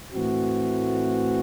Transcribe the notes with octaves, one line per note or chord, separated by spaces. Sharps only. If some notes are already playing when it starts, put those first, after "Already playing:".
A2 E3 A3 C4 F#4